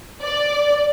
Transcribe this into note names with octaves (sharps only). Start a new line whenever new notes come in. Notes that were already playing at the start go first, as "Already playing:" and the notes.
D5